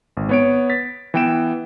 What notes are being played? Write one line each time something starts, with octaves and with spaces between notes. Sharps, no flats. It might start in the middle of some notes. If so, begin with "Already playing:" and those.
G#1
B3 C#5 D7
A6 B6
E3 B3 G5 D7 E7